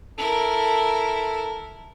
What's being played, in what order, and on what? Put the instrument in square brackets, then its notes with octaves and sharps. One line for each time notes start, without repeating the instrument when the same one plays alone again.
[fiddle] E4 A#4 [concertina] A4